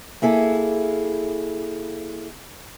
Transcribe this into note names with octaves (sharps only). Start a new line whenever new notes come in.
A#3 E4 G#4 A4